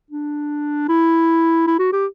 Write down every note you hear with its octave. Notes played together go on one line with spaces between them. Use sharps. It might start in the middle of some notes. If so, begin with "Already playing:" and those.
D4
E4
E4
F#4
G4